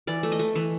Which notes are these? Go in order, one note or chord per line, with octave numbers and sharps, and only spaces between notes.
E3 D5
A3
D#5
A3
E3